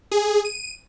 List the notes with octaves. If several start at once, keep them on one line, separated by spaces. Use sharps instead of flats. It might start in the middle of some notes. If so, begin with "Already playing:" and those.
G#4
D#7